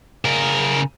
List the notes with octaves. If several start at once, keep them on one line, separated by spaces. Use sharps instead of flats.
C#3 A#4